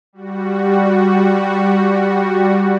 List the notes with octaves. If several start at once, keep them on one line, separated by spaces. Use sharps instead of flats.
G3 F#4